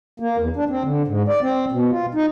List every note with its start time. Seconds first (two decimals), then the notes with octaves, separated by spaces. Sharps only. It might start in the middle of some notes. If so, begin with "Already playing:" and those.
0.20 A#3
0.37 E2
0.56 D4
0.70 C4
0.84 D3
1.08 G#2
1.28 D5
1.42 C4
1.72 B2
1.91 F4
2.15 D#4